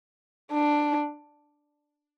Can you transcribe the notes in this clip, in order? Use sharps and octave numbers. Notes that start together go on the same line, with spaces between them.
D4